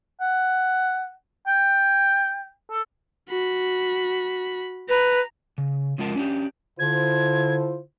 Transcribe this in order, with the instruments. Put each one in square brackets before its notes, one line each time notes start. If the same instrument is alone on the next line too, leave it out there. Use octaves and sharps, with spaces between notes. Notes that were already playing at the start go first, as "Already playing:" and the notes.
[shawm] F#5
G5
A4
[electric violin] F#4 B5
[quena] B4 [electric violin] A#5
[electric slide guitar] C#3
C#3 F3 G#3 F4 A#4 A5
C#4 D4 G4
[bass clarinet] D3 [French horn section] E4 F4 C5 [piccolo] G#6